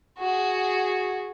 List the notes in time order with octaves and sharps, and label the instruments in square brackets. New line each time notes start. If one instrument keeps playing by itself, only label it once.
[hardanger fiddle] F#4 G#4